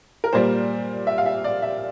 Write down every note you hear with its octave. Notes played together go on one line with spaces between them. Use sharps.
A#4
A#2 G3 A#3 C5
E5
F5
E5
D5
E5